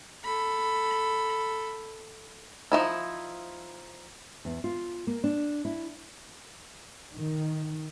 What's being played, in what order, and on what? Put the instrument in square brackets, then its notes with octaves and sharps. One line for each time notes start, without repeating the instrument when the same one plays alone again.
[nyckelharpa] A4 B5
[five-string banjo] F3 F#3 D#4 E4
[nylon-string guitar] E2
F4
A#3
D4
E4
[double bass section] D#3